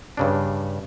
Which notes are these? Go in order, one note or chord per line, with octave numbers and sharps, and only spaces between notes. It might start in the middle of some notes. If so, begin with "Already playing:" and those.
G2 C#3 D4